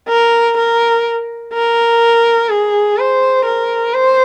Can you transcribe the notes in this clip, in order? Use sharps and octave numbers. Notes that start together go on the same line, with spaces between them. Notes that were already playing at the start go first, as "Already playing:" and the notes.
A#4
A#4
A#4
G#4
C5
A#4
C5